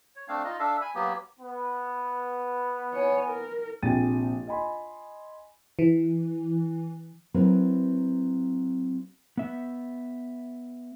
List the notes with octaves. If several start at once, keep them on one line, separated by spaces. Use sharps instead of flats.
C#5
A3 C4 D4 F5
D#4 F4 D#5
D4 A4 E5 F5
G#5 B5
F#3 A#3 B3 G4
B3
C#5 G#5
A#4
A#1 C3 G5 G#5 A6 D#7
D#5 G#5 B5 C6
E3
F#3 C4 E4 A#4 B4
B3 E5